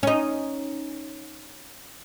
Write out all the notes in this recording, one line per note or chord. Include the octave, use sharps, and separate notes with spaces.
C#4 D#4